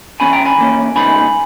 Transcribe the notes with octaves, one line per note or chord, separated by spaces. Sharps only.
E3 A#3 C#4 G#5 B5
G5 A#5
G#5 B5
E3 A#3 C#4
C#3 G#3 B3 D#4 G#5 B5